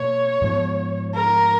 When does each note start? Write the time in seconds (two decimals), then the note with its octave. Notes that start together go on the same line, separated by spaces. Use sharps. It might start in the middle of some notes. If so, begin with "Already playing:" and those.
Already playing: B2 A#3 C#5
0.42 G#2 F3 B3
1.15 A#4